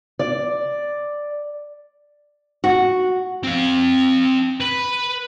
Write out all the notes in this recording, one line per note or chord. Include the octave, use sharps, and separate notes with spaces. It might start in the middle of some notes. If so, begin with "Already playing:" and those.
D5
F#4
C4 F5
B4